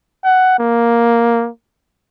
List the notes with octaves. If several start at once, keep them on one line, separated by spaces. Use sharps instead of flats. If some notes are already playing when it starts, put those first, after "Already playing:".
F#5
A#3